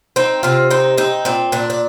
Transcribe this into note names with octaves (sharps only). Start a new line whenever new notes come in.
C4 D#4
C3 F4
C4 D#4
C4 D#4
A#2 C4
A#2 D4
D4